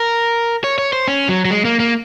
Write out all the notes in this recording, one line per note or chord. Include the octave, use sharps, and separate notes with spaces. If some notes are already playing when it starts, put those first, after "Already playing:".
Already playing: A#4
C#5
C#5
C5
C#4
F#3
F#3
G#3
A#3
A#3